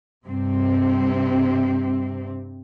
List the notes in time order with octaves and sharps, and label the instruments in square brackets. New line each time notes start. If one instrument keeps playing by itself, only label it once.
[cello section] G2 C3 C4